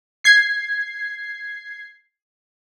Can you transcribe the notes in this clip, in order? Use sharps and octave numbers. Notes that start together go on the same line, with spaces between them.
G#6 C7